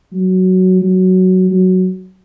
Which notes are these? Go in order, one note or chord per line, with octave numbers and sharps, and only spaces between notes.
F#3
F#3
F#3